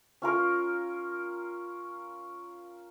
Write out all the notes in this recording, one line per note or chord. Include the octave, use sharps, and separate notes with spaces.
C#4 F4 A#4